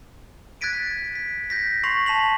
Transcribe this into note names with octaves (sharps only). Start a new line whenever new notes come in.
F#6 G#6 A6 B6 D7 D#7
B6
G6 A#6 B6
C6 C#6 A#6 C7 F7 F#7
A5 B6 F7 F#7